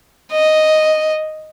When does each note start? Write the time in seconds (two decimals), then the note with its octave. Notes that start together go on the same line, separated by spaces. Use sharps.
0.32 D#5